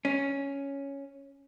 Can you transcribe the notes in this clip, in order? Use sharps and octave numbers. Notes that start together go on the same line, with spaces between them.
C#4